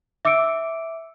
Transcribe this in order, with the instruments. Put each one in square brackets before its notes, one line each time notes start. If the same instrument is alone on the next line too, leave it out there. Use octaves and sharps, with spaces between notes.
[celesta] E5 D6 E6 C#7 D7